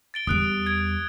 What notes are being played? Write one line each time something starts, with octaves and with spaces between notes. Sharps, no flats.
A6 D7 G7
E2 G3 D#6 F#6 D7
G#6 D7